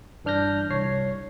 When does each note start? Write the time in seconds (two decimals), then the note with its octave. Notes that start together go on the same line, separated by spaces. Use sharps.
0.24 G2 E3 D4 F6 G6 A#6
0.71 C2 C#5 C7